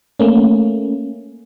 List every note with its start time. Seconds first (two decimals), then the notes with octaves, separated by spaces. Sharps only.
0.20 A3 A#3 C#4